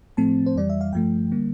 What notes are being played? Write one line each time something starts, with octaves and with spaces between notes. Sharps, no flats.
A2 F3 A3 C4 A5
C5
F2 E3 G3 D5
E5
F5
G2 F3 A3 G5
D3 G3 A#3